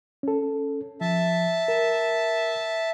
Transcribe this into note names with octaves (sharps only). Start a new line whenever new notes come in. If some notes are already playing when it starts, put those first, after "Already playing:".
C#4 A4
F3 E5 A5
A#4